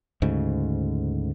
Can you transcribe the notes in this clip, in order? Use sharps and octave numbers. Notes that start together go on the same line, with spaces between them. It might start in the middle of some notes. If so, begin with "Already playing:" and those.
D2 G#2 C#3